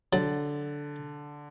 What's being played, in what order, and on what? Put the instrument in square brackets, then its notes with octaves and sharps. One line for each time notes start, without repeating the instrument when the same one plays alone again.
[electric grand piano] D3 A6 [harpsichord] F#3